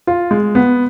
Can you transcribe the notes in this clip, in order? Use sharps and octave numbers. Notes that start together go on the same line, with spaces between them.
F4
G#3
B3